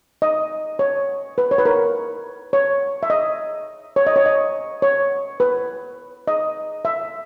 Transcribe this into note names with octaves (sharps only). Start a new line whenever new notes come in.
D#5
C#5
B4
C#5
B4
A#4
C#5
E5
D#5
C#5
D#5
C#5
D#5
C#5
B4
D#5
E5